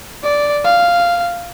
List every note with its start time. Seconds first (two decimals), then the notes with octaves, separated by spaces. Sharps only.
0.23 D5
0.65 F5